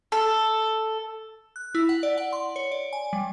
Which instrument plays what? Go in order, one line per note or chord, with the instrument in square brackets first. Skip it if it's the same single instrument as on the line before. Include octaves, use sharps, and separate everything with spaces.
[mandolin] A4
[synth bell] F#6
E4
F#5
D5
F#5
C6
C#5
D5
G#5
G3